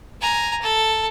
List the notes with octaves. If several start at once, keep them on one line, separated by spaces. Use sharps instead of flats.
G#5 A#5
A4